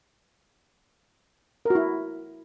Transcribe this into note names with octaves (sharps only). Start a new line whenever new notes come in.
E4 F#4 A#4